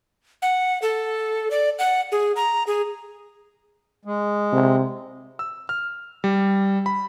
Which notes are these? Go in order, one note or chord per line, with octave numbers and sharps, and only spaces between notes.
F#5
A4
D5
F#5
G#4
A#5
G#4
G#3
C3
E6
F6
G3
B5